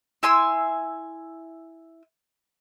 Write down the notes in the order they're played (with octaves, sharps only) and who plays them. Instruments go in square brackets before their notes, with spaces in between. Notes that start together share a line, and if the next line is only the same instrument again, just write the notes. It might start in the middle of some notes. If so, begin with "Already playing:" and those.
[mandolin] E4 G#5 C6 E6